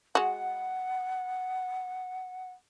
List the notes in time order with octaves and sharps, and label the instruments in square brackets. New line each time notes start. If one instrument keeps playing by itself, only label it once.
[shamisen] G#3 F#4 [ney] F#5